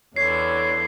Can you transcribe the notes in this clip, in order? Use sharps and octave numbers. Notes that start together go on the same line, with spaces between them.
E2 D3 E3 C#5 C7